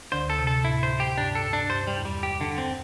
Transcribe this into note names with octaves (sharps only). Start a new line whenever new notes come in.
D2 D3 C5
A4
C3
A4
A2 E4
C5
G4
G2 D4
A4
D4
G2 C5
G3
E2
G3
G4
D3
C4